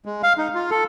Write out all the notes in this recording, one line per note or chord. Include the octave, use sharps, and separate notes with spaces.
G#3
F5
D#4
F4
A4